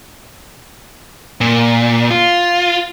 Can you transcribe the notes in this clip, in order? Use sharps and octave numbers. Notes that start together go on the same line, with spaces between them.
A#2
F4